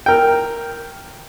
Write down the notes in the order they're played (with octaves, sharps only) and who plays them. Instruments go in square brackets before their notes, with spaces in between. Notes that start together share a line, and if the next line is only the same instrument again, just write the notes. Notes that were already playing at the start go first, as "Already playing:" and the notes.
[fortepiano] A#4 G5